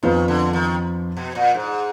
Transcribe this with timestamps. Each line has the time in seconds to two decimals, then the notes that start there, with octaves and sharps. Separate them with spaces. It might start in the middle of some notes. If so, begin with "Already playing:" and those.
0.03 F2 D#3 F3 B3 F4 B4
0.28 D3
0.53 D#3
1.17 B2
1.35 A#2
1.55 G#2